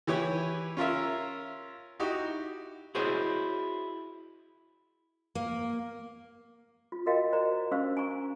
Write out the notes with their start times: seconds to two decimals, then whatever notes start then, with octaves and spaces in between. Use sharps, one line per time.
0.07 E3 E4 G4 B4 C#5
0.77 C#4 F4 A#4 E5
2.00 D#4 E4 F#4 G4
2.95 E4 F#4 G#4 C5 C#5 D#5
5.35 A#3
6.92 F4
7.06 F#4 A#4 D#5 F5 G5
7.32 C5 D5 A#5
7.71 C#4 D4 C5 F5 C#6 E6
7.97 G#5 A#5 C#6